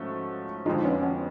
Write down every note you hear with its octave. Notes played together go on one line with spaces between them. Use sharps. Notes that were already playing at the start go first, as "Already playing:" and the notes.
Already playing: G#2 F3 A3 C#4 F#4
F2 D3 F3 G#3 D#4 F4
B3 C#4
B3 C#4